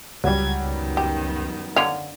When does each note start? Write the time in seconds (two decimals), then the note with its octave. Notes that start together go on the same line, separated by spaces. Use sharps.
0.24 C#2 F#3 G3 G#6
0.60 F#2 D#3 B3
0.97 G4
1.76 D3 C#5 F5